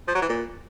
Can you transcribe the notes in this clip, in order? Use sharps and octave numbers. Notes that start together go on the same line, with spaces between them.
F3
F#3
E3
A#2